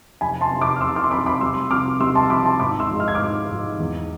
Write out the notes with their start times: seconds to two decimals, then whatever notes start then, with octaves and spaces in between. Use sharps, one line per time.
0.21 F1 G#5 B5
0.41 A5 C6
0.51 F2 C3
0.61 B5 D6
0.76 F6
0.81 F1 C6 E6
0.95 D6 F6
1.04 C6
1.11 F2 C3 B5 D6
1.26 B5 D6
1.41 C2 C6 E6
1.70 C3 F3 D6 F6
2.00 C2 C6 E6
2.15 A5 C6
2.30 C3 F3 B5 D6
2.45 A5 C6
2.60 G#1 B5 D6
2.80 C6 E6
2.89 G#2 F3
3.00 F6
3.08 G#6
3.15 G#1 D6 F6
3.50 G#2 F3
3.79 E2